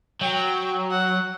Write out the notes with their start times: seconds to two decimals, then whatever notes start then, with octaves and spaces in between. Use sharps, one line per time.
0.21 F#3 G5
0.91 F#5